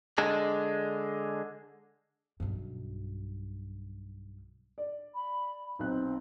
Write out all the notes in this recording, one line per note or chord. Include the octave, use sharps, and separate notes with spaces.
D3 G#3 D4
B1 G2
D5
B5
B1 C4 F#6